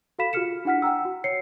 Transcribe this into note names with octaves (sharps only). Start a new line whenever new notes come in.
F#4 A4 F5 B5 B6 E7
F4 F#4 G#4 F6 C#7 E7
D4 E4 F#5 F6 B6
F#5 G5 A#5 E6
F#4
C#5 C7 C#7